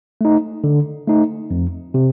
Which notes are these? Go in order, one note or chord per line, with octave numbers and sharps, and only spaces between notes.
A3 D#4
D3
A3 D#4
F2
C3